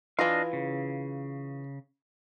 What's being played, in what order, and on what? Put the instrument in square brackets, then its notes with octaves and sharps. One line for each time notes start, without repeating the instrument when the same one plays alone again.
[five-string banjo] E3 F4 [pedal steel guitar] D4 D#5 F5
[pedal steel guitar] C#3